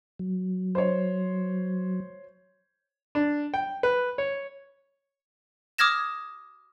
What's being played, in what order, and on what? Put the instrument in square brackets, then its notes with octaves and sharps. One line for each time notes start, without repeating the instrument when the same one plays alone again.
[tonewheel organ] F#3
[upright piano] C5 C#5
[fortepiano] D4
G5
B4
C#5
[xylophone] D6 D#6 F6 G#6 A#6 E7